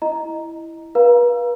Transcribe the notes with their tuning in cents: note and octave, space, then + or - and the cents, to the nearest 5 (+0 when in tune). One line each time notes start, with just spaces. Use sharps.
E4 +0 D#5 +0 A#5 +0
B4 -35 F5 +0 A#5 +25